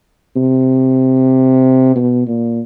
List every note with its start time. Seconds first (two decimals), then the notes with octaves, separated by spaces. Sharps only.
0.36 C3
1.96 B2
2.27 A#2